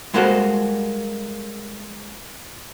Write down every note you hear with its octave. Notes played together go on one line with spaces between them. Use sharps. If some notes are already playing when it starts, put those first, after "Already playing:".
G3 G#3 A#3 F#4 A4 C5